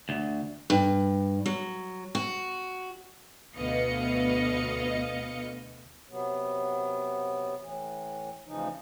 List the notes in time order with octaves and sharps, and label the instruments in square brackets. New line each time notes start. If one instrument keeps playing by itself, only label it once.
[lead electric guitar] D2
[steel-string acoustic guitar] G2
F#3
F#4
[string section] D2 B2 B4 D#5 F5 C#7
[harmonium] C3 F#3 B3
A2 E3
D2 C#3 E3 F3 D#4